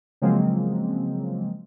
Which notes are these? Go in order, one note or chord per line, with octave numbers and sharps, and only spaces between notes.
C#3 F3 F#3 G#3 A#3 C4